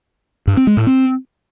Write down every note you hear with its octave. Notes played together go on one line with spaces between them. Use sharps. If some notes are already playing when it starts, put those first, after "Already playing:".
G2
C4
G#3
A2
C4